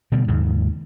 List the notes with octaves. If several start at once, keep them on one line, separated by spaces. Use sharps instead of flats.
B2 D3 G3
D#2 G#2 C#3